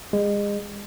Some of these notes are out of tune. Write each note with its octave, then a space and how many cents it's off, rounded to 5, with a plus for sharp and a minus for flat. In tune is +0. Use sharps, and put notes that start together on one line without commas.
G#3 -30